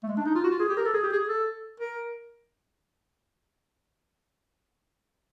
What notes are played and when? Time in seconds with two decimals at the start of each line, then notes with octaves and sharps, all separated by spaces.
0.03 A3
0.09 G#3
0.17 D4
0.26 D#4
0.35 F4
0.44 F#4
0.51 F4
0.60 G#4
0.69 G4
0.77 A#4
0.85 A4
0.94 G#4
1.03 G4
1.12 G#4
1.29 A4
1.80 A#4